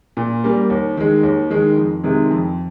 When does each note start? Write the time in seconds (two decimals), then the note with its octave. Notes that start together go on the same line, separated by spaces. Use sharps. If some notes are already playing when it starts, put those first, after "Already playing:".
0.17 A#2
0.44 G3 A#3
0.70 D#2
0.97 D#3 G#3
1.23 D#2
1.50 D#3 G#3
1.77 F2
2.04 C3 D#3 G#3
2.30 F2